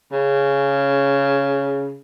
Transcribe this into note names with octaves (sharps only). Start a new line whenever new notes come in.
C#3